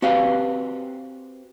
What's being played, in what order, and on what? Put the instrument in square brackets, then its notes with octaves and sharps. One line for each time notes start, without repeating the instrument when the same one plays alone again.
[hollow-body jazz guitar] C4 F#4 G4 B4 F5